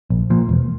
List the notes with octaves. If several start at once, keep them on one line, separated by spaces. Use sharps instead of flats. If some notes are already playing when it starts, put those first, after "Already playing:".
A#1
A#2 F3
E1